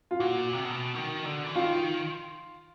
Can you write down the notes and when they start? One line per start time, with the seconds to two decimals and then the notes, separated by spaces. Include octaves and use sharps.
0.11 F4
0.20 A#2 F#4
0.53 C3
0.65 B2
0.95 D#3
1.25 D3
1.47 E3
1.55 D#3 F4